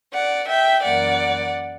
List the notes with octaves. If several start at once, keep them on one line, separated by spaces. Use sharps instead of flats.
D5 F#5
E5 G5
F#2 E3 A#3 D5 F#5